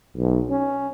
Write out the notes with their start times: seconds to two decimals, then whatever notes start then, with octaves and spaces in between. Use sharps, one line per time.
0.17 B1
0.50 C#4